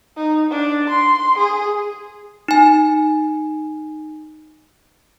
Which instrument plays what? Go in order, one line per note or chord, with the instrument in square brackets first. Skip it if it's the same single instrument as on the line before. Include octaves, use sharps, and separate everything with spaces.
[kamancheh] D#4
D4
C6
G#4
[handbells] D#4 G#5